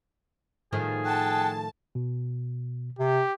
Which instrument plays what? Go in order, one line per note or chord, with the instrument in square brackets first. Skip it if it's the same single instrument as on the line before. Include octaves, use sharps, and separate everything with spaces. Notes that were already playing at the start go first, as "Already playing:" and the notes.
[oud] A2 D#3 F3 [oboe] G#4
[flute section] F#5 G5 F#6 [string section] A5
[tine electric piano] B2
[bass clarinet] C3 [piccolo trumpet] G4